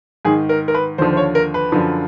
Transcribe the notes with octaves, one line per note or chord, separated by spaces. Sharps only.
G#2 D#3 G#4
A#4
A#4
B4
D#2 D3 F3 C5
C5
C#5
A#4
B4
F#2 D3 F3